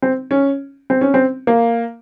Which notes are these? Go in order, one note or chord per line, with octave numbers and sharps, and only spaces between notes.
C4
C#4
C4
C#4
C4
A#3